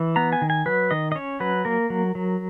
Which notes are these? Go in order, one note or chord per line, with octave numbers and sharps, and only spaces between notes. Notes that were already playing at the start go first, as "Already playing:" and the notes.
Already playing: E3
B3 A#5
G#5
D#3
G#5
F#3 B4
D#3 D#5
D#5
C#4 C#5
F#3 B4
A#3 A#4
F#3
F#3